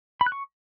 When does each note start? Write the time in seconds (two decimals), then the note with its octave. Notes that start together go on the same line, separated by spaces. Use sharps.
0.21 B5
0.26 F#6
0.32 C#6